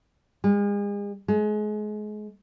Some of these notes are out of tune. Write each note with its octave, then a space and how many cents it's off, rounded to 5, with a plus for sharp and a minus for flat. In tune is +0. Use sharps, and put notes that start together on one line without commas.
G#3 -40
G#3 +30